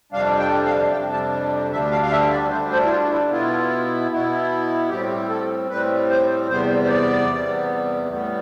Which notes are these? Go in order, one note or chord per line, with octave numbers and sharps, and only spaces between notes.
F2 C3 G3 D4 F5
G5
F5
F2 C3 G3 D4 G5
A5
D2 D3 G3 D4 E5
F5
F5
E5
D5
D2 D3 G3 D4 C5
C5
E4
F4
E4
B2 B3 E4 F4
B2 B3 E4
A2 G3 C4 G4
A4
A2 G3 C4 B4
C5
E2 C3 G3 B3 C5
C5
D5
E2 C3 G3 B3
A2 G3 B3